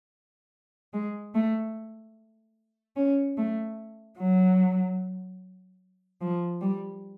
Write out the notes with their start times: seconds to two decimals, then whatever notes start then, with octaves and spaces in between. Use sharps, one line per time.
0.93 G#3
1.34 A3
2.96 C#4
3.37 A3
4.19 F#3
6.21 F3
6.61 G3